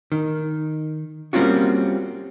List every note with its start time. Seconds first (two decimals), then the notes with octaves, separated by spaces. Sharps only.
0.12 D#3
1.33 G3 A#3 C4 C#4 F4 F#4